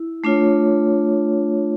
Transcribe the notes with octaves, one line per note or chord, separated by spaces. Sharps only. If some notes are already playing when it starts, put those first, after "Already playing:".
Already playing: E4
A3 D4 F4 C#5